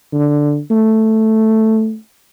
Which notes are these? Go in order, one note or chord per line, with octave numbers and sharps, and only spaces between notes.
D3
A3